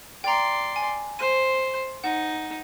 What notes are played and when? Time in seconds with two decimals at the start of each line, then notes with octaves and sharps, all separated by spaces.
0.24 D5 G5 A#5 C6
0.76 G#5
1.19 C5 D#7
2.04 D#4 F#5